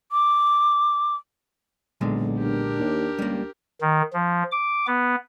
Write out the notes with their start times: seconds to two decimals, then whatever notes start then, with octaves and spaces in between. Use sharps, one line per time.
0.12 D6
2.01 B1 A#2 D3 G#3
2.39 D4 G4 A#4
2.79 D#2
3.19 C#2 G3 A#3
3.81 D#3
4.13 F3
4.52 D6
4.87 B3